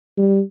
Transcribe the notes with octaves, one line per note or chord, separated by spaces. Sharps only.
G3